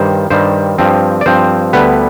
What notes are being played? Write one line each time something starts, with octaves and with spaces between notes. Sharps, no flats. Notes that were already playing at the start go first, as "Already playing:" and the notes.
Already playing: G2 D#3 G3 C5
G2 D#3 G3 C5
G2 F3 C4
D5
G2 F3 C4 C5
D2 D3 G3 B3 B4